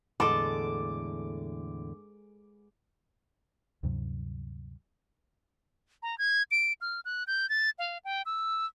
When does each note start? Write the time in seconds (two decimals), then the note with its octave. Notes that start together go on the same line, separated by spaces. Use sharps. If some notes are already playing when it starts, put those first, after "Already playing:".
0.20 E2 A2 D3 G#3 A4 D6
3.83 D2 G2 C3 F#3
6.03 A#5
6.18 G#6
6.51 D7
6.81 F6
7.05 F#6
7.27 G6
7.49 A6
7.79 F5
8.05 G5
8.26 E6